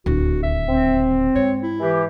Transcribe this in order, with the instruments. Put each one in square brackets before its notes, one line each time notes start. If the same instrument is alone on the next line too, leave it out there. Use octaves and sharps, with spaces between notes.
[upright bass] D1 D#2 [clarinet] F#4
[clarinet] E5
[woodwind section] C4
[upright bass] G#2 [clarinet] C#5
[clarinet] E4
[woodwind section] E3 G4